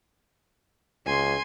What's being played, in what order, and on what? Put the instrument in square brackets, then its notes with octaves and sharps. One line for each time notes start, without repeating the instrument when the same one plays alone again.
[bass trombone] C#2 [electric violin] G#5 C6